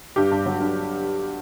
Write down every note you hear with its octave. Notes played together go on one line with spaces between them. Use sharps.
G2 G4
G2
F#3
G2